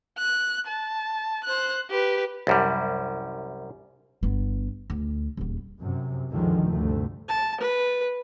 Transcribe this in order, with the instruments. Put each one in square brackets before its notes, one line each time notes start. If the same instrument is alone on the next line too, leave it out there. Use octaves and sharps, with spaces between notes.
[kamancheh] F#6
A5
C5 F#6
G4 B4
[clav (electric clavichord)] C2 F#2 G3
[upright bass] G1 B3
D2
D#1 E2
[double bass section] F#2 C3
C#2 F#2 D3 D#3 F3 G#3
D2 G2 C3 A3
[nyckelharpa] A5
B4